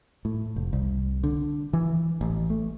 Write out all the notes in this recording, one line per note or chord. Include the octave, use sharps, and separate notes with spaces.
A2
F1
C2
D3
E3
A1
A3